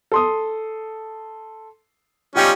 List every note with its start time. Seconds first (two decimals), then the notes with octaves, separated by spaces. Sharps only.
0.12 A4 C6 D#6
2.35 G3 C#4 D#4 F4 G4 G5